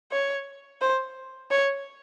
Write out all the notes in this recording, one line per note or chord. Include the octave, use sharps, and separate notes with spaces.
C#5
C5
C#5